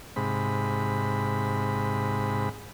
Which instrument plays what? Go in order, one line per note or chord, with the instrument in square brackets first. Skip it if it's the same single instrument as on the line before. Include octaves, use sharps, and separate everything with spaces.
[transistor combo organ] G#2 C3 B5